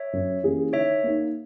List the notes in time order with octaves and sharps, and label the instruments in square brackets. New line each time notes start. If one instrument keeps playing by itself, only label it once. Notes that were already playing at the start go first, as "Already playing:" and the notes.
Already playing: [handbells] C#5 E5
[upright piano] F#2
E3 A#3 C#4 G#4
[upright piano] D#3 [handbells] C#5 E5
[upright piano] A#3 D#4